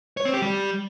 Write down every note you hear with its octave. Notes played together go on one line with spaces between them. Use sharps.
C#5
C4
G4
G3